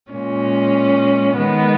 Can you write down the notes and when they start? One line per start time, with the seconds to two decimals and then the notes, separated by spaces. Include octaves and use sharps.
0.11 A#2 G#3 C#4
1.37 D#3 G#3 B3